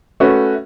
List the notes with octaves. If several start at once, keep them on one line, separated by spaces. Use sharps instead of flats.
A3 C#4 F#4 B4